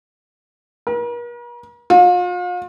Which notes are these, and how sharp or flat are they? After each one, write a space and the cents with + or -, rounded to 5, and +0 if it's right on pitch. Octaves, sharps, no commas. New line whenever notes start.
A#4 +45
F4 +40